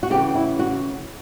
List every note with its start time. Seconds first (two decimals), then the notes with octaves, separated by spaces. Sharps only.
0.03 F#4
0.10 C#3 E3 B3 G4
0.35 E4
0.59 F#4